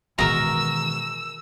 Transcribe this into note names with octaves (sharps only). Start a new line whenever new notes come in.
B2 D#3 E3 G#3 F#4 A#4 A#5 E6